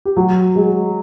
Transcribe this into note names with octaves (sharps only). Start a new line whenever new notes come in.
G4
F#3 F#4
G#3 G#4